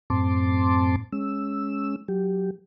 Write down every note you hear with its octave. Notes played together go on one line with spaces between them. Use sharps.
F#2 A2 C4 A5 C6 D6
G#3 C#4 E6
F#3 G4